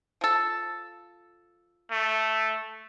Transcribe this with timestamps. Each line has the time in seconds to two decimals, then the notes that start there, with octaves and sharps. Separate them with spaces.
0.21 F3 A4
1.91 A3